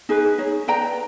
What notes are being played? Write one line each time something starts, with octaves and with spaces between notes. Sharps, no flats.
D#4 G#4 B4
D#4 G#4 C#5
B4 D5 G5 A#5